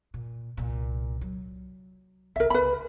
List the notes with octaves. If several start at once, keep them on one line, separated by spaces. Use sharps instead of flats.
A#2
C2 A#2
F#3
C2 A#4 E5
C#2 B4 B5